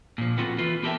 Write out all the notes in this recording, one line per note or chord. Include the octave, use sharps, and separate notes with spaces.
A#2 F3
B3 C4 F4 F#4 A4
E3 F4 B4
B3 G4 A4 A#4 E5 G5